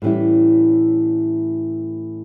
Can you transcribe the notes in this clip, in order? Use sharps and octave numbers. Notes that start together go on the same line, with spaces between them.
A2 E3 G3 C#4 E4